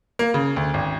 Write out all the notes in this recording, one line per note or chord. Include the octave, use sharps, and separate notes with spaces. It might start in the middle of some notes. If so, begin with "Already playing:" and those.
A#3
C#3
D2
G#1